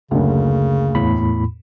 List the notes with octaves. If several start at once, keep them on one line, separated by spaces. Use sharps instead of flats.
F#1 D2 C#3
E2 A2 B5